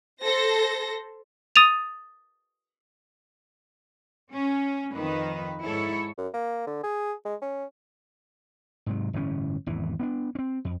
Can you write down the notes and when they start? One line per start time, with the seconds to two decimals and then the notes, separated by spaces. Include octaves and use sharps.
0.22 A4 C5 A#6
1.56 D#6 A6 D#7 F7
4.32 C#4
4.94 F2 D#3 B4
5.64 G#2 E4 A4 C#5
6.18 F#2
6.34 A#3
6.67 D3
6.84 G#4
7.25 G#3
7.42 C#4
8.86 G#2 C3 F#3
9.13 G1 A2 E3 C#4
9.66 G#1 E2 E3
10.00 B3 C#4 D4
10.35 C4 C#4
10.65 F2